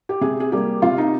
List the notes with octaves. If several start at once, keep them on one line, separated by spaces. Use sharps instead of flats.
G4
C3 G#4
G#4
G3 A#3 G4
C3 F4
D#4